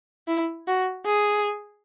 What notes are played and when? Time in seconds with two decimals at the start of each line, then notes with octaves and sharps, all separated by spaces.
0.28 E4
0.68 F#4
1.06 G#4